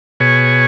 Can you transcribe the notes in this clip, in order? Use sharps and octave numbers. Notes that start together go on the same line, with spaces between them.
B2 G#4 C#5